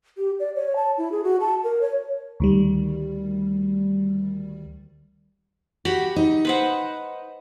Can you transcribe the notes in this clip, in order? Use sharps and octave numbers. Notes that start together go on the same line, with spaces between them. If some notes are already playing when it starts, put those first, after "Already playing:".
G4
D5
C#5
A5
E4
G#4
F#4
A5
A#4
C#5
D2 D#3 G3
F#4 G4 B5
D#4
B4 C5 F#5